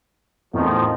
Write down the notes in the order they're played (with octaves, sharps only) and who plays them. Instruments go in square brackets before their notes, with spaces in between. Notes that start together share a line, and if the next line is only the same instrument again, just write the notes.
[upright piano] E2 A2 C4 [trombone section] D#3 F3